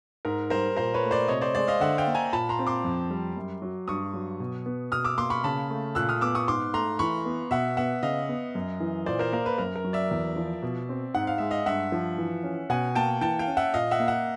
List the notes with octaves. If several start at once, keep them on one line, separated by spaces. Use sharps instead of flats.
G#2 A#4
G3 A#4 C5
A#2 A#4 C5
B4 C#5
A3
C5 D5
C3 C#5 D#5
C5 D5
G#3 C5 D5
D#5 F5
D3 E5 F#5
F5 G5
A#3
G#5 A#5
A#2 A5 B5
A#5 C6
C4
C6 D6
F2
G3
F#2
F#3
G2 C#6 D#6
F#3
B2
B3
B2 D#6 F6
D6 E6
A#3 C6 D6
B5 C#6
C#3 A5 B5
A3
A#2 E6 F#6
D#6 F6
B3 D6 E6
C#6 D#6
G#2 C6 D6
A3 A#5 C6
E3 B5 C#6
B3
B2 E5 F#5
B3 E5 F#5
C#3 D#5 F5
B3
F#2
E3
A#2 C5 D5
A#4 C5
A#3 A#4
B4
F#2 A#4
A#4
F#3
D5 E5
E2
F3
B2
C4
G#2 F#5
F5
G#3 E5
D#5 F5
G2 E5 F#5
F3
E3
C#4
B2 F#5 G#5
A#3 G5 A5
E3 G5 A5
F5 G5
C#4
E5 F#5
A#2 D#5 F5
E5 F#5
A#3
E5 F#5